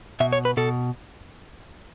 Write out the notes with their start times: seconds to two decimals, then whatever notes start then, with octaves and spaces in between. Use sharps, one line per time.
0.20 B2 E5
0.33 C#5
0.45 B4
0.57 B2 A4